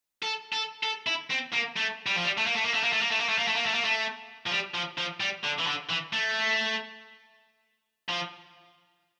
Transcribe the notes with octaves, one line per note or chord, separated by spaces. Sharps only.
A4
A4
A4
E4
C4
A#3
A3
G3
F3
G3
A3
A#3
A3
A#3
A3
A#3
A3
A#3
A3
A#3
A3
A#3
A3
A#3
A3
A#3
A3
F3
G3
F3
F3
G3
D3
E3
D3
E3
A3
F3